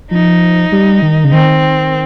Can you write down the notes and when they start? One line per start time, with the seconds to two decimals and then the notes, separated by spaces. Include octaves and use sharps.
0.11 F3 D#4
0.72 G3
1.02 D#3
1.24 C#3
1.33 D#3 C4